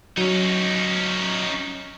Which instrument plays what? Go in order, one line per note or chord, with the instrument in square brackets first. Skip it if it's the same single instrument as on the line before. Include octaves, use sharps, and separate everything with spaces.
[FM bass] F#3 [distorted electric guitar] C#4 D#4